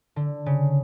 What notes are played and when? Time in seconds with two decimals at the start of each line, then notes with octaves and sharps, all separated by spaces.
0.16 D3
0.46 C#3